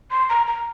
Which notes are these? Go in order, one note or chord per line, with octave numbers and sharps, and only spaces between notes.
C6
A#5
A#5